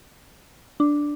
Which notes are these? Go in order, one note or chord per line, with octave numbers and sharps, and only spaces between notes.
D4